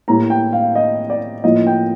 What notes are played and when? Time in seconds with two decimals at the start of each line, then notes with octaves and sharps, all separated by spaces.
0.08 A2 G3 A#3 A#5
0.30 G5
0.53 F5
0.75 D#5
1.10 D5
1.44 A2 F3 A#3 D#5
1.67 G5